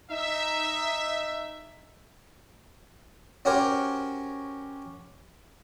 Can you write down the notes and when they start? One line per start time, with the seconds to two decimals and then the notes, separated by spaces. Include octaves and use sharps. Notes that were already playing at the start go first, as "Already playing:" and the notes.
0.11 D#4 E5
3.45 C#4 F#4 G4 A#4 C5 C#5